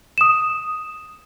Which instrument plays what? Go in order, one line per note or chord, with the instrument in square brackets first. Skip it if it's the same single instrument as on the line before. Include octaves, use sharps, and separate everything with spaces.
[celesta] D#6 E7